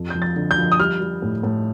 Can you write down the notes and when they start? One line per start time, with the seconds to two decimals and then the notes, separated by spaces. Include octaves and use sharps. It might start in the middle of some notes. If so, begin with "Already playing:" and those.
Already playing: F2
0.10 F3 G6
0.22 A6
0.36 D3
0.51 G6
0.58 F3
0.72 D#6
0.79 G3 F6
1.00 G3
1.22 A2
1.43 A2